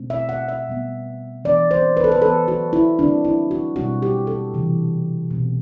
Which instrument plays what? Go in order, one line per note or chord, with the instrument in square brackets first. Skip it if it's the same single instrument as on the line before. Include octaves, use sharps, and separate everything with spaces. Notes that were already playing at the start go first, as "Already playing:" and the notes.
Already playing: [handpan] B2 A3 C4
E5
F#5
E5
B2 G3 B3
E3 B3 D5
C5
B4
A4
B4
E3 B3 A4
F#4
E4
D3 G3 C4 D4
E4
F#4
B2 G3 C4 F#4
G4
A4
C3 E3 G3
B2 A3 C4